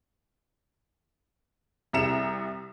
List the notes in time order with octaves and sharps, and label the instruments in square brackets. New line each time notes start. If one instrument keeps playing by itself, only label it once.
[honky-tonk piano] C2 C3 E5 A#5 C#7 E7